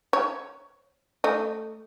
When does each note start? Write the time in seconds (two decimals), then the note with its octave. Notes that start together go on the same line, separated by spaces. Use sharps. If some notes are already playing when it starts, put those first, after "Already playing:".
0.13 C#5
1.24 A3 D#5